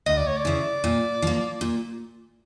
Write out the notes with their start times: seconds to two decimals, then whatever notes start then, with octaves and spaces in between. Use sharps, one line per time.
0.06 D2 D#5
0.17 D5
0.27 C#5
0.37 D5
0.45 C#3 E3
0.84 A#2
1.22 F3 A#3
1.61 A#2